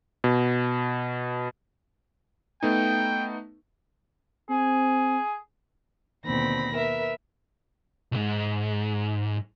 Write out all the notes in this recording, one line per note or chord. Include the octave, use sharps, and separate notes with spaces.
B2
A3 B3 D#4 G5
C4 G#4
D#2 B2 D3 C4 B5 A#6
A#4 B4 E5
B1 G#2